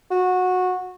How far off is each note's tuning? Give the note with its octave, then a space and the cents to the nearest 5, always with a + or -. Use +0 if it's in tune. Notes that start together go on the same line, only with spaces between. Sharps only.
F#4 -15